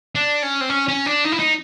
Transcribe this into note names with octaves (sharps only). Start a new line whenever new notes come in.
D4
C#4
C4
C#4
C#4
D4
D#4
E4
D#4